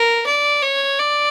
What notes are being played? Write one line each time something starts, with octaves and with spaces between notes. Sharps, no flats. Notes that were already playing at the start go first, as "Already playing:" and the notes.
Already playing: A#4
D5
C#5
D5